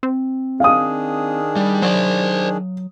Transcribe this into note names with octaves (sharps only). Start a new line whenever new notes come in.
C4
D#3 D4 G#4 F5 D#6
G3
F#3 C5 D5